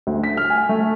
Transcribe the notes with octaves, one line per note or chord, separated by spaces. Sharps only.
D2
B6
F6
G#5
A3